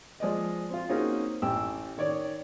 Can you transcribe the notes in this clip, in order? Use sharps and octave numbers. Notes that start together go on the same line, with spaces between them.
F3 G#3 D5 D#5
C4 F4
A#3 C4 C#4 D#4 F#4 G#4
A1 G4 G5 E6
D#3 C#5 D5